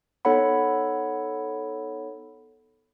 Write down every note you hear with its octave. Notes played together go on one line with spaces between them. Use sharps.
B3 D#4 A4 C#5 F#5 B5